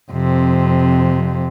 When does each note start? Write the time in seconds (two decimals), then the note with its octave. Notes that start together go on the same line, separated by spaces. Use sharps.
0.12 F2 C3